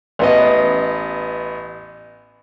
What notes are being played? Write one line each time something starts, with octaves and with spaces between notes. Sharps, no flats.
A1 B3 D#5